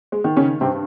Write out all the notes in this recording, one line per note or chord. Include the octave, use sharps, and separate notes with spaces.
G#3
D#3
C#3 C#4
G2 C3 C4